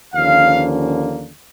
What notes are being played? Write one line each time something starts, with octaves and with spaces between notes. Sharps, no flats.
D#2 D3 F3 A#3 C#4 F5